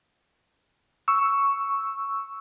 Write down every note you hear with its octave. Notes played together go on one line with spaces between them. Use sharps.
C#6 E6